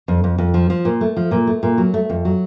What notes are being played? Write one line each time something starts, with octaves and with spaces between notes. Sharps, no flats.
F2
F2
F2
F3
F3
A#2
A3
F3
A#2
A3
A#2
F#3
A3
F2
F#3